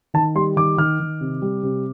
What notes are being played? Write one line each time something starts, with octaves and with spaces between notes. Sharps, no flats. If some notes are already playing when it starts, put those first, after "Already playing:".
D#3 A5
G3 C6
D#3 D6
D#3 F6
D#3
C3
G3
C3